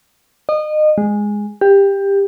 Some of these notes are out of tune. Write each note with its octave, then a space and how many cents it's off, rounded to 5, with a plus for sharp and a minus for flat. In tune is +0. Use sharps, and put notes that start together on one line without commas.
D#5 -30
G#3 -5
G4 +15